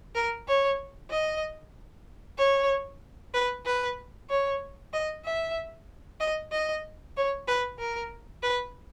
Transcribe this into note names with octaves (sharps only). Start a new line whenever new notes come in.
A#4
C#5
D#5
C#5
B4
B4
C#5
D#5
E5
D#5
D#5
C#5
B4
A#4
B4